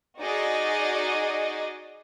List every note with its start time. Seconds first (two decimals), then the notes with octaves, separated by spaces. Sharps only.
0.19 D#4 F#4 G#4 D5 D#5